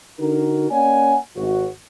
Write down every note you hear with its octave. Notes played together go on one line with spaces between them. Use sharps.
D3 D#4 F#4 A#4
A#3 C#4 C#5 D5 F#5 G#5
G#1 F#4